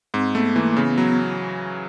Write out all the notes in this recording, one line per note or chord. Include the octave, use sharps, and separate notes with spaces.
G#2 C4
A3 B3
E3 A#3
C#3 B3
F#3 B3